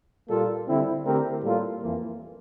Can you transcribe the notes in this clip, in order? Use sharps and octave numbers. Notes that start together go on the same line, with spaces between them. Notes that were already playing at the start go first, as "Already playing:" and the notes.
A#2 G3 A#3 F4 A4
D3 G3 C4 E4
D3 A3 C4 G4 A#4
A2 G3 A#3 F4 A4
F2 E3 A#3